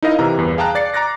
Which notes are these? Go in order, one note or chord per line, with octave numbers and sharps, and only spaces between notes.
D#4 E4 A#4 D#5 F5
C3 E3 A#4 A#5
G1 E2 B4
G#4 F5 G5 A5 A#5 F#6
D5 A6 C7 C#7
A#5 D6 F#6 A6 A#6